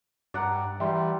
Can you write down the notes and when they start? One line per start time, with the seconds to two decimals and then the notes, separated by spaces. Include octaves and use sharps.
0.34 G2 D5 F#5 A#5
0.80 E3 G3 E5 G5 C6